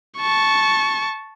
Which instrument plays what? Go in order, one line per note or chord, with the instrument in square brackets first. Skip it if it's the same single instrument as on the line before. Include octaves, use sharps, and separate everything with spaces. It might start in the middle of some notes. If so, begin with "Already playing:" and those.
[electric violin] A5 C#6